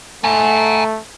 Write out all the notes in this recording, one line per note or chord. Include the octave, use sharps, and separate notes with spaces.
A3 G#5 A#5